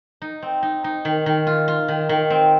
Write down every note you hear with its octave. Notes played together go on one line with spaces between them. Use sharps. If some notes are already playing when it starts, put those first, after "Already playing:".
D#4
C4
D#4
D#4
D#3
D#3
F4
F4
D#3
D#3
C4